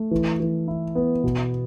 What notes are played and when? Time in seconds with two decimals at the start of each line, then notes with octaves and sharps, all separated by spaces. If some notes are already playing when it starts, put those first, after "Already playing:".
Already playing: A3
0.11 E3
0.40 E3
0.68 E4
0.95 B3
1.24 B2